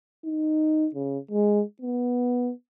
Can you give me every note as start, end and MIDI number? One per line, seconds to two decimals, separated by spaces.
0.25 0.89 63
0.94 1.18 49
1.31 1.63 56
1.82 2.51 59